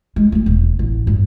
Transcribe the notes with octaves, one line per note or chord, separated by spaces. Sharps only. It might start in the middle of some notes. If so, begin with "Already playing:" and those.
G#3
A3 C4
E1
A1
G2